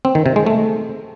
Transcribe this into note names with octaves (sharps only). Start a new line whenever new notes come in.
C4
D#3
C3
G#3
A3